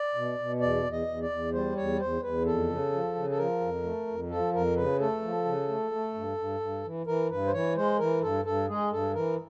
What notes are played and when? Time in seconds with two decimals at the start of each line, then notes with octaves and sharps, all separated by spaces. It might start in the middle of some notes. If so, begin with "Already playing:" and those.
Already playing: D5
0.15 B2
0.39 B2
0.61 E2 D5
0.84 E2
0.92 D#5
1.07 E2
1.22 D5
1.30 E2
1.53 G3 C5
1.76 E2 C#5
2.00 E2 C5
2.22 E2 B4
2.45 F2 A4
2.68 C#3
2.92 F3
3.15 C#3
3.30 A4
3.37 F3 A#4
3.60 F2
3.83 A3
4.07 F2
4.29 F3 A4
4.53 F2 A#4
4.76 C#3 B4
5.00 A3 A4
5.22 F3
5.45 C#3
5.68 A3
5.91 A3
6.14 G2
6.37 G2
6.60 G2
6.84 E3
7.06 E3 A#4
7.29 G2 B4
7.47 C5
7.53 E3 C#5
7.76 G#3 C5
7.99 E3 A#4
8.22 G2 A4
8.45 G2 A4
8.68 G#3 G#4
8.91 G2 A4
9.14 E3 A#4